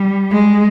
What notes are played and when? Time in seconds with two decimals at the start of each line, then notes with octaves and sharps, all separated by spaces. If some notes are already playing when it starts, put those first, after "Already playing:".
Already playing: G3
0.32 G#3